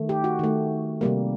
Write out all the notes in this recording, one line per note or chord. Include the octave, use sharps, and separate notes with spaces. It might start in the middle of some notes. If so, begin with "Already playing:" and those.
Already playing: D#3 A3
G4
F#4
D#3 A3
C3 G3 A#3